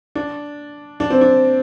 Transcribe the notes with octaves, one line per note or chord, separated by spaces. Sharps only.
D4
D4
C4
D4